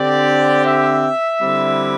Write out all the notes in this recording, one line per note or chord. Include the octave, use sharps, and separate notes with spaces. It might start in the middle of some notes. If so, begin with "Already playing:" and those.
Already playing: D3 C4 G4 D5
E5
D3 G3 C4 E4